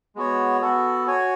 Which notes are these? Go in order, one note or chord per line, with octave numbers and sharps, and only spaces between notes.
G#3 B3 F#4 C#5
B3 F#4 A4
F#4 C#5 G#5